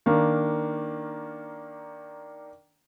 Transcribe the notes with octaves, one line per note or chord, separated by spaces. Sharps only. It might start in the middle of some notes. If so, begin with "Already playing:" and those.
D#3 A#3 D4